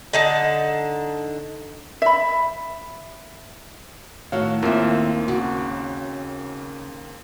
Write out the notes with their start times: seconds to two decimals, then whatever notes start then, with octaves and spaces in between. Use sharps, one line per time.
0.13 D3 D#4 A5
2.02 E5 B5
4.32 A2 D#3 F#4 C#5 F5
4.63 D#2 A#3 C4 F4 E5
5.28 C#3 F#4